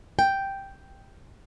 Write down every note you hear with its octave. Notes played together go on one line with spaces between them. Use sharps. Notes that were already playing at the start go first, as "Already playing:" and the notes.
G5